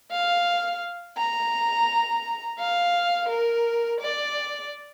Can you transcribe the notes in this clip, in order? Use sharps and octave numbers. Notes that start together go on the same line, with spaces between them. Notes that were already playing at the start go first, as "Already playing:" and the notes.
F5
A#5
F5
A#4
D5